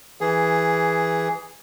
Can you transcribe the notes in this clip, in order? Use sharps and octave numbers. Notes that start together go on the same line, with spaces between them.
E3 G#4